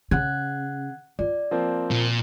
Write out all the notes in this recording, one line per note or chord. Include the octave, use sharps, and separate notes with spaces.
C#3 F#5 F#6 G#6
F4 D5
F3 A#3 C4
A#2